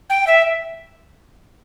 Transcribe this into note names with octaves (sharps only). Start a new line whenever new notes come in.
G5
E5